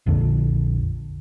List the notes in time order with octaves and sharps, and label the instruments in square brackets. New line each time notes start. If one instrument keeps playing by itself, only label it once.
[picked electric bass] A#1 F2 D3